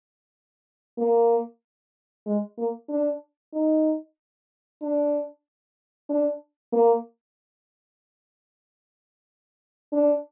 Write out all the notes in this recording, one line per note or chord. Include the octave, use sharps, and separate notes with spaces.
A#3
G#3
A#3
D4
D#4
D4
D4
A#3
D4